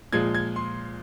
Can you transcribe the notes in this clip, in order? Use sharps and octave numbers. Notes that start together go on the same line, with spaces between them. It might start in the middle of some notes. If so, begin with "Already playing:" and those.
A#2 F3 G#3 G#6
G#6
C6